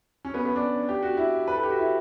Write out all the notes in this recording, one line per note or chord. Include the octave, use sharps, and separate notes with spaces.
C#4
B3
B3
D4
G4
F#4
E4
B4
A4
G4
F#4
E4